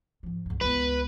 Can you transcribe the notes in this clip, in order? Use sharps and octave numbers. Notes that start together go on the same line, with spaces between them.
G#2 F3
C#2 G2
C#2 B3 B4